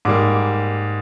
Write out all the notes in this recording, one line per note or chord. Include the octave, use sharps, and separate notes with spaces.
G#2 G3 A#3 D6